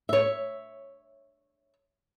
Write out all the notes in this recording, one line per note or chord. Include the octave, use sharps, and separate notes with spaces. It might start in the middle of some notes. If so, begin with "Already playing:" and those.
C#5 E5